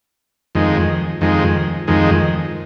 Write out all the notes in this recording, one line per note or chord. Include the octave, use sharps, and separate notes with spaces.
F2 D#3 G#3
F2 D#3 G#3
F2 D#3 G#3